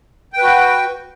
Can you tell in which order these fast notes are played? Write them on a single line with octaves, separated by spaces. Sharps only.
G5 B4 F#4